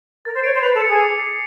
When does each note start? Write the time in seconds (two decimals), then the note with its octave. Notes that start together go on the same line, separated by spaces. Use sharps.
0.25 A#4 A6
0.34 C5
0.44 C#5 D7
0.53 C5
0.63 B4 F7
0.75 A4
0.82 C#7
0.89 G#4
1.01 D6
1.20 C7